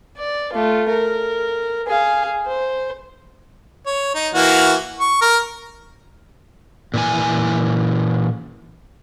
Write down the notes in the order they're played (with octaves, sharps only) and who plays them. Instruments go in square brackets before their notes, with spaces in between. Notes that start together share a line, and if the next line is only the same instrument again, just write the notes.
[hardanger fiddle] D5
A3 F4
A#4
G#4 F5
C5
[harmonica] C#5
D#4
E3 A#3 F#4
C#6
A#4
[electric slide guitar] A#2 E3 G#5